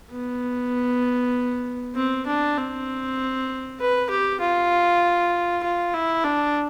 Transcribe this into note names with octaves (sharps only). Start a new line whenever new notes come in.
B3
C4
D4
C4
B4
G4
F4
F4
E4
D4